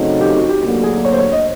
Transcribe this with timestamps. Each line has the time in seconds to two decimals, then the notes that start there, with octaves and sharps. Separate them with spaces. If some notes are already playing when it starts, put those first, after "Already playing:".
Already playing: C#3 F#3 A3 C4 D#4
0.21 G4
0.35 F#4
0.49 G4
0.63 D2 D3 F#3 A#3 G4
0.83 G#4
1.05 C#5
1.12 C5
1.18 C#5
1.32 D#5